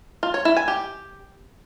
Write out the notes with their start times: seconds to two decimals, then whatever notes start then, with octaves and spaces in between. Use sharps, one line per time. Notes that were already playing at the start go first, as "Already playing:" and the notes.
0.23 F4
0.34 C#5
0.45 E4
0.57 G#5
0.68 G4